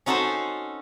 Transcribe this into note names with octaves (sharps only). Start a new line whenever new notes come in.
C#4 D#4 F#4 A4 C5 A5